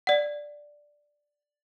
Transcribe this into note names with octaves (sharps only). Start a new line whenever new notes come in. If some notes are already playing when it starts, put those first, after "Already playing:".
D5 F#5